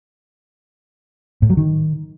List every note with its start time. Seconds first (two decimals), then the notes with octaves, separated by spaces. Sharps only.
1.42 A2
1.50 F#3
1.57 D#3